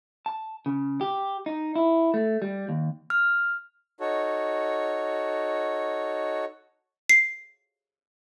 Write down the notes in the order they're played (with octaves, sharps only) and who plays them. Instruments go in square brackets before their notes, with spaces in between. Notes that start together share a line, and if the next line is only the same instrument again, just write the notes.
[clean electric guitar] A5
C#3
G4
D#4
E4
A3
G3
D#2
[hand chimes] F6
[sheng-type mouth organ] D#4 F#4 A4 C#5
[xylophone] C7